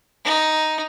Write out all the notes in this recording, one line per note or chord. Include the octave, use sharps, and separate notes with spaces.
D#4